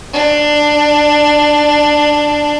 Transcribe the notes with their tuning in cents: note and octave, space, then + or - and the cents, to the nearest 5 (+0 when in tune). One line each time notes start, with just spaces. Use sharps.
D4 +10